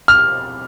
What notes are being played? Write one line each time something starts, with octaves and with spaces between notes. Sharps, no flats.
F6